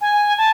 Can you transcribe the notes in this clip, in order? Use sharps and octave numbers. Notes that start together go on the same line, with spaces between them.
G#5
A5